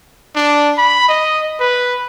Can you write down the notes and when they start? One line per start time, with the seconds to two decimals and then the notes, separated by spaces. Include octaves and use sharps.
0.36 D4
0.78 B5
1.09 D#5
1.60 B4